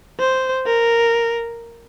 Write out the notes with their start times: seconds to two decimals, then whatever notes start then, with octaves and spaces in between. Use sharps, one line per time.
0.20 C5
0.66 A#4